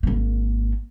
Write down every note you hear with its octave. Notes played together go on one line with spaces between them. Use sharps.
G#1 A#3